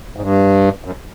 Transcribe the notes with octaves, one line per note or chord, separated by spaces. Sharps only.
G#2
G2
F#2